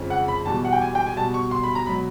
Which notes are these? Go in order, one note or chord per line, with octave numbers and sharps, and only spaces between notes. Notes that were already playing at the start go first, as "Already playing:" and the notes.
Already playing: F2 C#3 F3 G#3
F#5
B5
E2 B2 G3 A5
F#5
G5
G#5
G5
G#5
B2 G3 A5
C#6
C6
B5
A#5
B2 F#3 B5